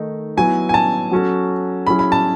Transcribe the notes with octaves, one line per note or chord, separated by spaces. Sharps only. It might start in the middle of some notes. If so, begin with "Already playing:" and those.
Already playing: D#3 A3 D#4
F#3 B3 E4 G#5
G#5
A5
F#3 C#4 F#4 A4
F#3 C#4 E4 G#4 B5
B5
A5